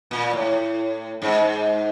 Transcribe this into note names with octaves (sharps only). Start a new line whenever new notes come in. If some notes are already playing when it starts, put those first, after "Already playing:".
A#2
A2
G#2